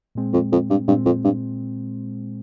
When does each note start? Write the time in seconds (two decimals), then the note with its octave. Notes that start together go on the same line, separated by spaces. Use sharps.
0.15 A#2 G#3 C4
0.33 F2
0.52 F2
0.70 G2
0.88 G2 A#2 G#3 C4
1.06 F2
1.24 G2